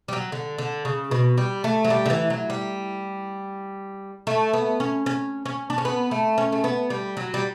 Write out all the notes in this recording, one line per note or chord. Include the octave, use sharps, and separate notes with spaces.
G3
F#3
D3
D3
C#3
B2
G3
A3
F#3
G3
D3
E3
F#3
G3
A3
B3
C#4
C#4
C#4
D4
C#4
B3
A3
C#4
A3
B3
G3
F#3
G3